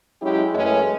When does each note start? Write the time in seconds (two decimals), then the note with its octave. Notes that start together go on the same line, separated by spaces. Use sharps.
0.22 F#3 G#3 C#4 E4 G4
0.53 F#2 E3 G#3 A3 C#4